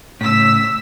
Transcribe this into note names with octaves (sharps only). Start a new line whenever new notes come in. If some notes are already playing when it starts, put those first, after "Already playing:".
A2 C#3 E6 B6